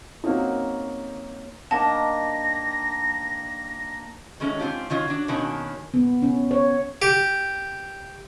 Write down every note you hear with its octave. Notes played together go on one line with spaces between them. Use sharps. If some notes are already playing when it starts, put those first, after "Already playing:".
F#3 A#3 C4 C#4 D#4
D#3 A#3 D4 F#5 A5 A#6
D#3 F#3 G#3 A3 C#4
G#2 C4 C#4 F4 G4
D#3 F#3 C#4 F4 C#5
F#3 D4
B2 D#3 F#3 A#3 C#4 D4
B3
C#4
C#5
G4